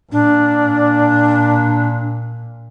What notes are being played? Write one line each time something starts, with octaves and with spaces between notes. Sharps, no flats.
A#2 D4